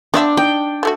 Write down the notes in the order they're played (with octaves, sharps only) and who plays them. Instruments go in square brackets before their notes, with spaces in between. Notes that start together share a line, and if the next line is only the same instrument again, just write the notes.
[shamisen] B3 C4 E5 [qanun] D4
[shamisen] D#4 [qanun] G5
[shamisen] F3 A3 F#4